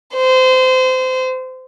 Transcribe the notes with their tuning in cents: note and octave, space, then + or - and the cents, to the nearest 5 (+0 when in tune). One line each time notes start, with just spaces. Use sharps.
C5 -25